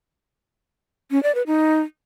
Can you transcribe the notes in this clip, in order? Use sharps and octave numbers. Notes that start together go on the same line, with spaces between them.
C#4
D5
B4
D#4